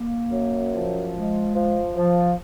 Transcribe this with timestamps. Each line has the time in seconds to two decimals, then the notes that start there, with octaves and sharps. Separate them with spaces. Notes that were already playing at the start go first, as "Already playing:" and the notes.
Already playing: A#3
0.30 F#2
0.72 F3
1.13 G#3
1.54 F3
1.96 F3